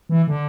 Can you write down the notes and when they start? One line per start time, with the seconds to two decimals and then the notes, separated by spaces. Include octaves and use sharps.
0.09 E3
0.27 D3